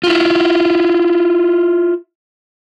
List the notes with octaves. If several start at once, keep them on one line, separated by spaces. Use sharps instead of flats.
E4 F4